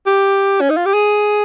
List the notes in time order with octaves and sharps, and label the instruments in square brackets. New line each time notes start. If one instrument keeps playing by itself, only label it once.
[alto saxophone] G4
C#4
D#4
F4
G4
G#4